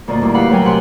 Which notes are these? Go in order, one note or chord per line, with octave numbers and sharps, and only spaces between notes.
D2 A#2 A#3 D5 D#5
D2 G2 E4
G4 B4 F5 F#5 B5
F#3 A3 A#4 G5 G#5
C3 F#5 C6 F#6